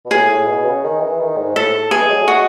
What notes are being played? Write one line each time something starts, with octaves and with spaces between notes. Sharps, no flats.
B2
A2 G#4
A2
B2
C#3
D#3
E3
D#3
G#2
A2 A4
E3 G#4
G#3
F#3
A3
G#3 F#4